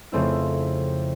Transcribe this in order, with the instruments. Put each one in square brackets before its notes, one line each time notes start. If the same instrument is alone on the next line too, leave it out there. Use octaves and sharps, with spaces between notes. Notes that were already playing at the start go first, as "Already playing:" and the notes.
[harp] F2 C#3 A3 C4 E4